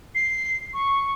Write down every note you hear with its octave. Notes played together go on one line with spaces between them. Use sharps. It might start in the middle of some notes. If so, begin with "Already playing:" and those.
C7
C#6